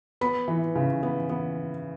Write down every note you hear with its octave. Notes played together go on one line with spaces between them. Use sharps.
B3 B5
E3
C#3
B3
B3